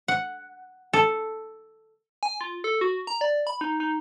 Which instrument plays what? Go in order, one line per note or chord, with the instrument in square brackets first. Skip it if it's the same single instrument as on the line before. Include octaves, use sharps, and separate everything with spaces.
[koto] F#5
A4
[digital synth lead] G#5
F4
A4
F#4
A#5
D5
B5
D#4
D#4